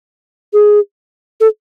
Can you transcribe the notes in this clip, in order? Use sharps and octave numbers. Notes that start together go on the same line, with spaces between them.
G#4
A4